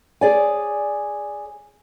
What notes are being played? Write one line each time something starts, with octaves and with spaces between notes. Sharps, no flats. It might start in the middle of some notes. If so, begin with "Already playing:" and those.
G#4 D5 G#5